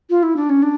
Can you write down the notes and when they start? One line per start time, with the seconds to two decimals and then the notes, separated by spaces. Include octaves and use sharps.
0.10 F4
0.23 E4
0.36 D4
0.49 C#4
0.62 D4